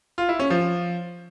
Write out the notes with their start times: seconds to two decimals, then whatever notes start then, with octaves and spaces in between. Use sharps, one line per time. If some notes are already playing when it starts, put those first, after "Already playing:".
0.18 F4
0.29 E4
0.39 C#4
0.50 F3